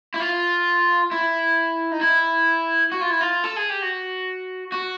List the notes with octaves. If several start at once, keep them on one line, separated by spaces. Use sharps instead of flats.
E4
F4
E4
D#4
E4
F#4
F4
E4
F4
A4
G#4
G4
F#4
F#4